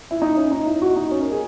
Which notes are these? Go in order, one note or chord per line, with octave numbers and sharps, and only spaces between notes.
E4
D#4
C#4
D#4
E4
F#4
D#4
C#4
A#4
G#4